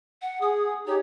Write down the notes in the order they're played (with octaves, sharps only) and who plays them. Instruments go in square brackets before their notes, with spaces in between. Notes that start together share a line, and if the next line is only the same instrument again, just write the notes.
[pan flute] F#5
[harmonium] G#4 [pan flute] D#6
[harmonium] D#4 G4 [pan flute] C#5